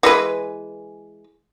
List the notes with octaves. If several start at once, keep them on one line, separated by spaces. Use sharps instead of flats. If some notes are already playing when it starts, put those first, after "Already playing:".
E3 G#3 B4